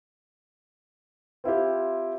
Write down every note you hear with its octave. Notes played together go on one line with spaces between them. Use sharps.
C4 E4 F4 G4